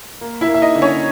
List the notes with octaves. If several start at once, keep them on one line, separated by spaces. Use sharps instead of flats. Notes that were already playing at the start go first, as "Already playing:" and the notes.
A#3
E4 E5
A#3
E5
D#4 D#5
D3
C#4 C#5